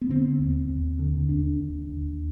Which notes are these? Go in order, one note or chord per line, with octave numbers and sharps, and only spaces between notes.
B3
D3 C4
D#2
D#2
D3
D#2 D4
D#2
D#2